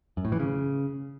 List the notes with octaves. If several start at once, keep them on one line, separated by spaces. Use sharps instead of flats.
F#2
A2
E3
C#3